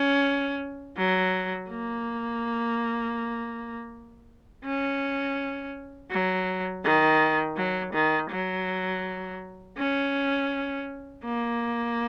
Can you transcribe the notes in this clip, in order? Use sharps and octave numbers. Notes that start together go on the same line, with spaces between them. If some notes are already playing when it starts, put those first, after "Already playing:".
Already playing: C#4
F#3
A#3
C#4
F#3
D#3
F#3
D#3
F#3
C#4
A#3